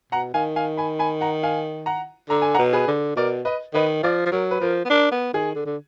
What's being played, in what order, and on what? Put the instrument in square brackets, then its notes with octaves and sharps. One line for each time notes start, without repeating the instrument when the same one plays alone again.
[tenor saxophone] B2 [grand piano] F#5 A#5
[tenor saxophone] D#3 [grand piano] F5 G#5
[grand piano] F5 G#5
G#5 B5
G#5 B5
F#5 A#5
F5 G#5
F#5 A#5
[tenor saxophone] D3 [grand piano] A#5
[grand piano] G#5
F#5 A#5
[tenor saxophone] B2
[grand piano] G#4 B4
[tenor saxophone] D3
[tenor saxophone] B2 [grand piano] A#4 D5
[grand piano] B4 D#5
[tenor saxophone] D#3 [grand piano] B4 D#5
[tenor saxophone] F3 [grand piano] D5 F5
[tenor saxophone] F3
[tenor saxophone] F#3 [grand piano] A#4
[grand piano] B4
[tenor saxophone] F3 [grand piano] A#4
[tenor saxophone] B3
[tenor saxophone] D4 [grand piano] A#4
[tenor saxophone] B3
[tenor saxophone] D#3 [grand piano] G#4
[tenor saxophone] D3
D3